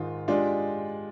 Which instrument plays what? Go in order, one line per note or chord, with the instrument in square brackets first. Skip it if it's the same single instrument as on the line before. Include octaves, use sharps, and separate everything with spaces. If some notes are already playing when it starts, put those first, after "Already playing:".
Already playing: [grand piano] G#2 D#3 G#3 [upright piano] F4
[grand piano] G#3 D#4 G4 D5 [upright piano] D4 F4